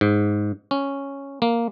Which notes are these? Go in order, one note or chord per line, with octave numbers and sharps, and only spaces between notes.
G#2
C#4
A#3